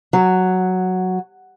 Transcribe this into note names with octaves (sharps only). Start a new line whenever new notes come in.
F#3